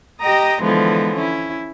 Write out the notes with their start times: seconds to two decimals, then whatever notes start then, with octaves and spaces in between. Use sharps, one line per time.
0.20 G4 D#5 G5 A#5 D#6
0.61 D3 E3 F3 G#3 B3
1.15 C#4 E4